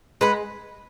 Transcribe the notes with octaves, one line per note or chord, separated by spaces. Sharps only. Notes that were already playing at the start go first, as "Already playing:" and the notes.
G#3 B4 F#5 B5